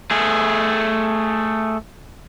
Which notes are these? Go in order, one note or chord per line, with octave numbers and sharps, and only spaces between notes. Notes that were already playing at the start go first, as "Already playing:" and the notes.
A3 G#4